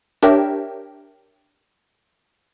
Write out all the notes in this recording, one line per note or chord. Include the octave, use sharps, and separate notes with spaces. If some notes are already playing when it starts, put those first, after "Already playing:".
D4 G4 A#4 C#5 E5 G5